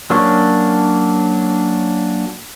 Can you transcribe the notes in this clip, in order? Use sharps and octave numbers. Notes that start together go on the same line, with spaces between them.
F#3 A#3 C#4 D4 C#6